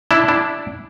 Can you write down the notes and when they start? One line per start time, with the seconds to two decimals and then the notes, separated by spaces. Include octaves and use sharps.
0.11 D4 E4
0.28 D4 E4